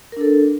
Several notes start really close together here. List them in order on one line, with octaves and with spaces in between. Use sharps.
A#4 D4 A4